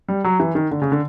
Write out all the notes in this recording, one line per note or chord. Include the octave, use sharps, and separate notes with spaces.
G3
F#3
E3
D#3
D3
C#3
D3